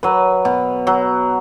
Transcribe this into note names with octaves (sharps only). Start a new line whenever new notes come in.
F#3 B4
B2
F#3